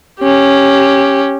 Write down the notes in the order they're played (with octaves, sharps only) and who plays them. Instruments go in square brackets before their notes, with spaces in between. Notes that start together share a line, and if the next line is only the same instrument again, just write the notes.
[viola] C#4 G4